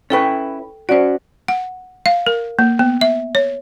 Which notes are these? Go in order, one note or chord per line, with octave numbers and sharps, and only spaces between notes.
C#4 E4 A4 B4 G5 C#6
C#4 F#4 C5 D5
F#5
F5
A#4
A#3
B3
E5
C#5